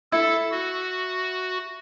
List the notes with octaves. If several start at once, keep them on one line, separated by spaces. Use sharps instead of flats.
E4 A4
F#4